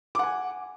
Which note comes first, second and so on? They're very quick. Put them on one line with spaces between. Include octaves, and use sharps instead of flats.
D6 F#5 G#5